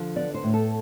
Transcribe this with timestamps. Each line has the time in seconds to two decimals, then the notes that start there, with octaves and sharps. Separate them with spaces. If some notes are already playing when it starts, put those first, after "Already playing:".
Already playing: D3 F3
0.16 B3 D5
0.34 C5
0.44 A2
0.54 A4